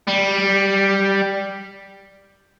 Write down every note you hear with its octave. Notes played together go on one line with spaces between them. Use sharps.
G3